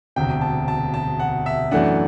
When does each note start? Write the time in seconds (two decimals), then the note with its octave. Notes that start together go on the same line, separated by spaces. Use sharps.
0.16 E1 D2 C3 G5
0.41 A5
0.68 A5
0.94 A5
1.19 F#5
1.46 E5
1.71 F#2 E3 A3 D4 F#5